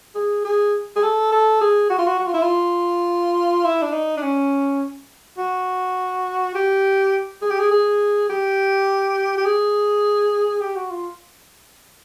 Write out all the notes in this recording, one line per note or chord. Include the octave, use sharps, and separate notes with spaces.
G#4
G#4
G#4
A4
A4
G#4
F#4
F4
F#4
F#4
F4
E4
F4
E4
D4
D#4
D4
C#4
F#4
G4
G#4
G4
G#4
G#4
G4
G4
G#4
G4
F#4
F4